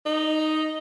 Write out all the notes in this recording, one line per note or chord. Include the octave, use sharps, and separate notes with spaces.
D#4